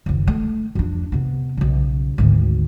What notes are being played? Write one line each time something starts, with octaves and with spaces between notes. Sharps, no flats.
F#1 D#2
A3
F2 D4
C3 B3
B1 C#3
G#1 D2